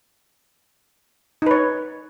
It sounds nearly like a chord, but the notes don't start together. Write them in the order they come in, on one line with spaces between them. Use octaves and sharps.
D#4 B4 C#5